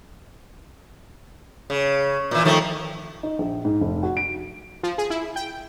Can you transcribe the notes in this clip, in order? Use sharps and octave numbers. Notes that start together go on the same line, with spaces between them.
C#3
A#2 E3
D#3 F3 A3
D#4
A#1
G#2
F1
F#4
D7
F3
G#4
E4
G5